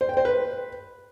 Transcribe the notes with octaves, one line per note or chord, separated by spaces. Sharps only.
C5
G5
C5
B4